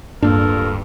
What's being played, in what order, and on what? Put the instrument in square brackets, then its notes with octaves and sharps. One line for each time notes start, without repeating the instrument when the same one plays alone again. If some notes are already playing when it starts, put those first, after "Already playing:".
[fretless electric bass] D1 A#3 D4 [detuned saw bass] G2 [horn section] F4 A4 A#4